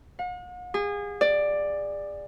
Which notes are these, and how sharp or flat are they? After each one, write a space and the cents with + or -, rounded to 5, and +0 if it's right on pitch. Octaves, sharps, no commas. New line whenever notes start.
F#5 -45
G#4 -30
D5 +10